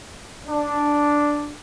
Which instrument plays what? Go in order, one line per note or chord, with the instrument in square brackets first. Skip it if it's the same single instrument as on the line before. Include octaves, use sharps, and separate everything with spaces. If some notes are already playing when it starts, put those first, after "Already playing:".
[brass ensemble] D4